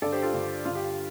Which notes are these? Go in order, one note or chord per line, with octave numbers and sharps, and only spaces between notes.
G2 D3 A4 D5
G4 C5
F4 A4
G2 D3
G2 D3 F4
G4